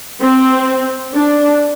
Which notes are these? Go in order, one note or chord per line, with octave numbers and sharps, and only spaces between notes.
C4
D4